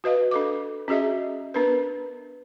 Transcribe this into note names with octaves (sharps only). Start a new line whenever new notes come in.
F#4 B4 D#5 F5
D4 A4 D6
C#4 F#4 G#4 D#5 E5
B3 D4 A#4 B4